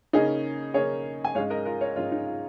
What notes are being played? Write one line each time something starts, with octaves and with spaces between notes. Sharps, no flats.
C#3 A#3 C#4 D#4 G#4
C#3 A#3 C#4 G#4 C#5
G#5
G#2 G#3 C#4 C#5 F5
A#4 D#5
F4 A#4
C#5 F5
G#2 G#3 C#4 F4
D#4
F4